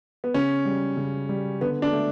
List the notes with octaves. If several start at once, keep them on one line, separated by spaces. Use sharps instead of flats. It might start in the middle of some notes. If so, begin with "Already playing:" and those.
B3
C#3 C#4
G3
C#3
G3
D3 B3
D4
A3